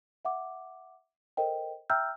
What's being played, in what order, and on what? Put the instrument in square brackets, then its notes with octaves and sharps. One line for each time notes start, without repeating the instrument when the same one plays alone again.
[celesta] E5 F#5 D6
A4 A#4 C5 D#5 G5
E5 G5 A#5 E6 F6 G6